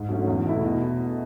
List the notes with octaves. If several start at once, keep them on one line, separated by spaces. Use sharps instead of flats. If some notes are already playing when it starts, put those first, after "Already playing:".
Already playing: G#2
F#3 A3 C#4
E2
B2 A3 E4
B2